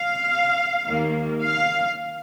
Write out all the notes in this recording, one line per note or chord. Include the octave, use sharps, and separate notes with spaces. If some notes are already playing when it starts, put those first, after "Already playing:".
Already playing: F5
D#2 D#3 A#3
F5